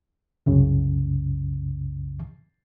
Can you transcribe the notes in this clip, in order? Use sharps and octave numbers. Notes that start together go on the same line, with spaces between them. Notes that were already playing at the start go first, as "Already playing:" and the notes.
C2 F#2 C#3